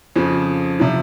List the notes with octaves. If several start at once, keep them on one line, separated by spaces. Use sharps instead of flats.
F2 C#3 F3
C3 F3